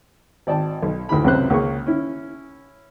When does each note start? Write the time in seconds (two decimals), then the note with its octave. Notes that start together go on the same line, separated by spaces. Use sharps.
0.47 G#1 D5 G5 A5
0.83 B1
1.09 D2 A2 D#3 B5
1.24 C#2 F#2 C3 B4 C5 F#6
1.50 C#2 A#3 G#4 C#6
1.86 C#4 E4